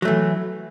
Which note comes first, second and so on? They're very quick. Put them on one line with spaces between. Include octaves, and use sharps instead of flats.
F#3 A3 E3